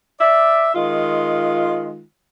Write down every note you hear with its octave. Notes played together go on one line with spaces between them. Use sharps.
D5 E5
D#3 G#3 F4